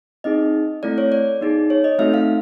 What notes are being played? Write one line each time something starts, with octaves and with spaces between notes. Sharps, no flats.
C4 D#4 G#4 D#5
A3 C4 E4 A4 D5
C#5
D5
B3 D#4 G#4
C#5
D#5
A3 C4 D#4 F#4 A4 E5
F5